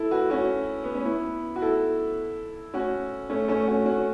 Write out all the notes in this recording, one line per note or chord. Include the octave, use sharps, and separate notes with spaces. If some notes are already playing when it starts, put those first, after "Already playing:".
Already playing: E4 A4
F#4 B4
C#4 F#4
B3
C#4
B3 E4
F#4
E4 A4
C#4 F#4
A3 C#4
A3 C#4
C#4 F#4
C#4 F#4